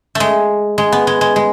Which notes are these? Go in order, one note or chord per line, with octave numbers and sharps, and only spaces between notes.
G#3 A3
G#3
B3
G#3
G#3
G#3